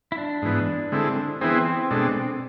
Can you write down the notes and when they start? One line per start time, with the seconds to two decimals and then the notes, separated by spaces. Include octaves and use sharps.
0.12 E4
0.18 D4
0.42 G#2 E3 B3
0.92 D3 G#3 C4 E4 A4
1.41 E3 B3 C4 E4 G#4 C5
1.90 B2 G#3 D4 A4